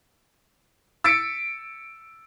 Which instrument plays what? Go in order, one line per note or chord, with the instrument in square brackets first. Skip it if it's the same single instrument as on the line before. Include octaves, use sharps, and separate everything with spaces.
[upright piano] E6 A6 B6 C#7 D7